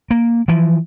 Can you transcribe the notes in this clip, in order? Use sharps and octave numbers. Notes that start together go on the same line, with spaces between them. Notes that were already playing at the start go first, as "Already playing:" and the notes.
A#3
E3 F3